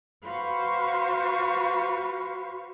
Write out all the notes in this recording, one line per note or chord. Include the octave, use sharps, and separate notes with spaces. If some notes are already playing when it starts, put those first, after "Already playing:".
F#4 B4 C5 F5 C#6